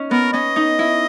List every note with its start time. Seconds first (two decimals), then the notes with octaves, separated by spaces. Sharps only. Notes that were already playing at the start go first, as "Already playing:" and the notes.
Already playing: C#4 D#4
0.11 B3 A#4
0.33 C#4 D#5
0.56 D#4
0.79 E4